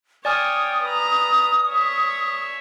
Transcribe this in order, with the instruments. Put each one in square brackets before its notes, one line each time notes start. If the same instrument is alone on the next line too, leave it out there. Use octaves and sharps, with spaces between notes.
[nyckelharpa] C#5 G5 [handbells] D5 G#5 F6 [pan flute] D#6
[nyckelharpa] B4 A#5
C#5 E5